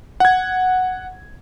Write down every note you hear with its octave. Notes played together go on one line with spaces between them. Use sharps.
F#5 G#6